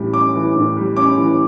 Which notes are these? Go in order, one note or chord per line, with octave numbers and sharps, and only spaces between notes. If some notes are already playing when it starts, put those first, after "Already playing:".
Already playing: A2 E3 G3 C#4
C#4 D6
E3
A2
G3
C#4 D6
E3